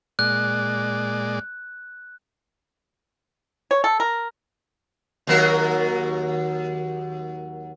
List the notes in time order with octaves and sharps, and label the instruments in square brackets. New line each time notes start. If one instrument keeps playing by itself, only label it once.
[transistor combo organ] A#2 G#3 D5 [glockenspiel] F#6
[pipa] C#5
A4
A#4
[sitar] D#2 F#3 A#4